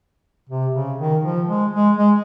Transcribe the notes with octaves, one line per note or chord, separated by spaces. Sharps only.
C3
C#3
D#3
F3
G#3
G#3
G#3